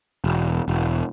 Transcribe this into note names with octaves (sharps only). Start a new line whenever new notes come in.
E1
E1